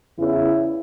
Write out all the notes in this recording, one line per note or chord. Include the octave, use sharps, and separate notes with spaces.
E2 C#3 E3 E4